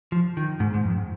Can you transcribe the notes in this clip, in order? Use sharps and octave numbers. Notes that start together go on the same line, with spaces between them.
F3
D#3
G#2
G#2
F2